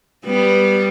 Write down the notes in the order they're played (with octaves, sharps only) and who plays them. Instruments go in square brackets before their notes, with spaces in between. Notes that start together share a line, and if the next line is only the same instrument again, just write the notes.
[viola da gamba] G3 B3